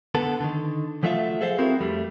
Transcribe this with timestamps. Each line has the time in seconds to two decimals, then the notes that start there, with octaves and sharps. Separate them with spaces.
0.15 D3 B3 A4
0.41 D3 D#3
1.03 F3 F#3 A3 F4 E5 F5
1.41 G#4 A4 C5 E5 F5
1.58 C4 E4 F#4 G#4 A#4
1.81 F2 G3 A3